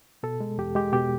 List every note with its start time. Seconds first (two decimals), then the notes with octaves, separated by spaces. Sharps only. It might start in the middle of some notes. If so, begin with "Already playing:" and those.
0.23 B2 A4
0.40 G#3
0.58 E2 G4
0.75 G#3 G4
0.93 B2 G4